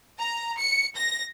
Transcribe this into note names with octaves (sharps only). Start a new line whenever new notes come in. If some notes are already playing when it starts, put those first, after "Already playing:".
A#5
C#7
A#6